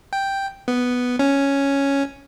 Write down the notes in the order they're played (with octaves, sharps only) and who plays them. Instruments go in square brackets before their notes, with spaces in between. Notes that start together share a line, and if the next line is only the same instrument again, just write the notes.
[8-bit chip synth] G5
B3
C#4